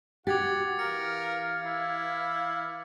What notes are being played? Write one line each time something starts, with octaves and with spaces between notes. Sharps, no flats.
F#4 G4 F#5 D6 G#6 A6
E3 A#4 F5 C#7
E4